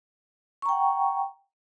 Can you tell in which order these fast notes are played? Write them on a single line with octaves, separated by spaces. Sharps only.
C#6 A#5 G5 F#5